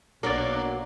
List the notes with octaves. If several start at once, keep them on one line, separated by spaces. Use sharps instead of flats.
B1 F#3 A#3 D4 A#4 D5